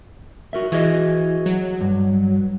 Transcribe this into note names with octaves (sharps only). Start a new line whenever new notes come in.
F#4 A#4 E5
E3 F#4 G#4 D#5
F#3
G2